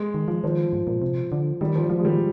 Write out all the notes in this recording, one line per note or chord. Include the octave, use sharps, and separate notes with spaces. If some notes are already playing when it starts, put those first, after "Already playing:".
Already playing: G#3
D#3
F3
D#3 F3
G#2
A#2
C3
D3
D#3 G3
F3
F3 G3
G#3
D#3 G3